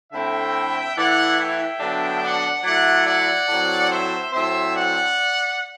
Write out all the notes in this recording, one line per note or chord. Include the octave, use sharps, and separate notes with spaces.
D3 A3 C4 E4 E5 G5
E3 A3 E4 D5 F#5
E5 G5
D3 F#3 B3 D4
D5 F#5
F#3 A3 E4 D5 F#5
D5 F#5
A2 F#3 C4
C5 E5
A2 F#3 C4 C5 E5
D5 F#5